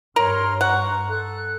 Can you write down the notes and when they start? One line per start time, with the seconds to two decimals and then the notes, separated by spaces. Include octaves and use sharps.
0.16 G2 A#4 C#5 C6 F6
0.61 F#5 A#5 C#6
1.08 A4 F#6